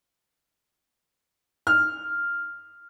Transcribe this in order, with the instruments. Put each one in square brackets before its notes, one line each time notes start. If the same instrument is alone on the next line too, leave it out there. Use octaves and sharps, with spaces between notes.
[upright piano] F6